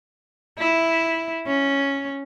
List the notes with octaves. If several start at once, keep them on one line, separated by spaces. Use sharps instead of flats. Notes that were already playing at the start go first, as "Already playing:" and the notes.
E4
C#4